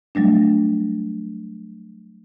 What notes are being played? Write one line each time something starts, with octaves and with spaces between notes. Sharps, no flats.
F#3 G3 A3 D4